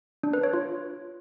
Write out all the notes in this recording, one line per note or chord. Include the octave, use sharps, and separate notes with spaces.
D4
B4
C#5
F4